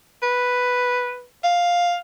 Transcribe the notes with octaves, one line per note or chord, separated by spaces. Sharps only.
B4
F5